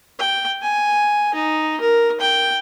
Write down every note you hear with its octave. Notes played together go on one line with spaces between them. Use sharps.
G5
G#5
D#4
A#4
G5